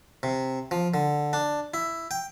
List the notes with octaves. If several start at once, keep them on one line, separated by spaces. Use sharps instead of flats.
C3
F3
D3
D4
E4
G5